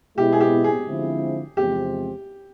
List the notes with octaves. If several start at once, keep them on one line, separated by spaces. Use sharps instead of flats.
B2 G#3 B3 E4 G4
G#4
G4
G#4
D3 F3 G#3 C4 E4
E2 C3 F3 G#3 C4 G4